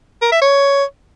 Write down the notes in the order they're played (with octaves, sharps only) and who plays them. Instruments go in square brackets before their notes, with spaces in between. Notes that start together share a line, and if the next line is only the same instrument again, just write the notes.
[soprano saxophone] A#4
E5
C#5